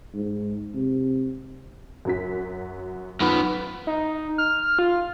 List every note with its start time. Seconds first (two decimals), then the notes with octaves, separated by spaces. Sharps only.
0.14 G#2
0.75 C3
2.05 F#2 F#3 B6
3.20 F#2 B3 D#4 F4 B5
3.87 D#4
4.38 F6
4.79 F4